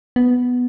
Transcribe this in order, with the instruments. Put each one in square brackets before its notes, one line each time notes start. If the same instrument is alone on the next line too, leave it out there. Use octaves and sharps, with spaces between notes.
[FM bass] B3